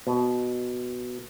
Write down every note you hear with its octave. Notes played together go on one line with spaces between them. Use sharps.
B2